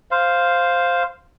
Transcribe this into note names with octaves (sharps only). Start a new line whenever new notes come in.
C5 F5